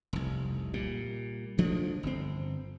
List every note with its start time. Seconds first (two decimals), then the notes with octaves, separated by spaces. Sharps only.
0.13 F1 C2
0.74 A#2 G3
1.58 D2 F3 A3 D4
2.03 G1 C4